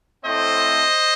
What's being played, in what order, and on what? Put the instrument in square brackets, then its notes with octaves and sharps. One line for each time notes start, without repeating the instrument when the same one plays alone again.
[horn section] A2 A3 C4 C5 D#5